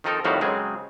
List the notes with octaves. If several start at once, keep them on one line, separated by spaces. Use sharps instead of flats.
D#3 F3 C4 D#4 A4 A#4
F2 A2 D#3 G3 F#4 F5
C#3 F#3 G#3 C4 G#4